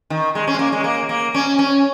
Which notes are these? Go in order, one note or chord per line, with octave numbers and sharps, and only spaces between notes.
D#3
G#3
C#4
G#3
A#3
G#3
A#3
A#3
C#4
C#4